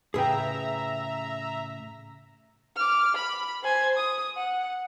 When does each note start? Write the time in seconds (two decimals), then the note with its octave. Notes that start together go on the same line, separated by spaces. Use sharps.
0.14 A2 C#3 G#4 B4 E5 G5 A#5
2.76 D6 F6
3.15 B5
3.64 C5 G#5
3.98 D#6
4.37 F#5